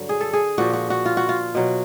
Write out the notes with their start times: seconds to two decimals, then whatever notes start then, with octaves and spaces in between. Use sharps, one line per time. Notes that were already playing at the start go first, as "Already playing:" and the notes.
Already playing: G2 D3 F#3
0.09 G#4
0.21 A4
0.33 G#4
0.58 A#2 F3 F#4
0.74 F#4
0.90 F#4
1.06 F4
1.17 F#4
1.29 F4
1.55 B2 F#3